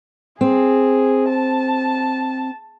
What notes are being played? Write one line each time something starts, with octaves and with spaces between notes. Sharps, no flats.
C4 G#4
A5